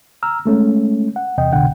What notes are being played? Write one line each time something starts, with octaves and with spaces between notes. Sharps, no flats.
A#5 E6 F6
G#3 A3 C#4
F#5
E2 C3 D#5 G5
C2 G#2 B2 D3 F#5 G5